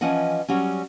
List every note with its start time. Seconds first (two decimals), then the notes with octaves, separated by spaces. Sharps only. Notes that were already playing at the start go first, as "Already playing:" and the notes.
0.01 E3 F3 C#4 D#5 F#5
0.48 F#3 G3 C#4